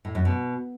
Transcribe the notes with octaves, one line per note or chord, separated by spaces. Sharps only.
A2
F#2
B2